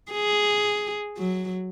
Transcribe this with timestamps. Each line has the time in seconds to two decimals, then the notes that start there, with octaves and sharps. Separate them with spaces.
0.12 G#4
1.18 F#3